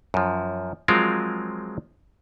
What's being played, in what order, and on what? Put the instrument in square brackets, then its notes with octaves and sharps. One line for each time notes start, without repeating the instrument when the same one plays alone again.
[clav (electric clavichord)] F#2 F3
F3 F#3 G#3 C4 F4 A#4